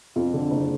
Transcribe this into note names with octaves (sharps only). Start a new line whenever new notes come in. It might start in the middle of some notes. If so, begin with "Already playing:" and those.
F2 F4
D3
F#1